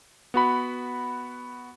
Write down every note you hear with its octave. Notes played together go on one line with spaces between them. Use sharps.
B3 F#4 B5